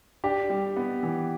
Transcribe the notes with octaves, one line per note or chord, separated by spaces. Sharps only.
D4 G4
G3
B3
E3